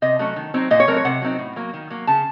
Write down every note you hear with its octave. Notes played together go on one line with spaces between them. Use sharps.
C3 D#5
F#3 A3 C#4
D#3
F#3 C4 D#4
A#2 D#5
C#5
F#3 A3 C4 A#4
C#5
C3 F#5
F#3 C4 D#4
A2
F#3 A#3
D#3
F#3 A#3
C#3 A5